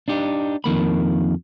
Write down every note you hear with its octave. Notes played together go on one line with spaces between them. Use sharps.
D4 D#4 G4
F2 D#3 A#3 B5